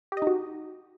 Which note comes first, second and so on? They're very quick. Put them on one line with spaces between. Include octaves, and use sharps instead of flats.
G4 D#5 D#4 F#4